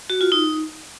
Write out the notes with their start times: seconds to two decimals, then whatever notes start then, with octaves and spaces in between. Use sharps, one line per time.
0.10 F#4
0.21 F4
0.32 D#4